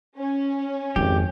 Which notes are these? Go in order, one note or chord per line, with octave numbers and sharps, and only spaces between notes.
C#4
G#1 F2 G4